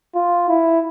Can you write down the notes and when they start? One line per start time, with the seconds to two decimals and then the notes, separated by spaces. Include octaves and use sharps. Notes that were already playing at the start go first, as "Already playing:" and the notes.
0.15 F4
0.49 E4